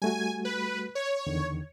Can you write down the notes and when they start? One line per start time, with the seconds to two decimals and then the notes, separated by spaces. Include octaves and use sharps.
0.02 G3 A3 F#4 G#5
0.45 B4
0.95 C#5
1.27 E2 D3 D#3